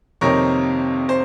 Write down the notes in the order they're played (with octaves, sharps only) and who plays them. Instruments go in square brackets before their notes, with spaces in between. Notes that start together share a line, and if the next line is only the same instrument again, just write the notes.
[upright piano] F2 C3 D#3 A#3 D#4 A#4 C#5
C5